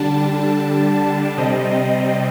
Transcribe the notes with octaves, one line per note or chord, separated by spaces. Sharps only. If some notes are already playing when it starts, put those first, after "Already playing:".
Already playing: D3 G3 D4 A5
C3 G3 C4 D#5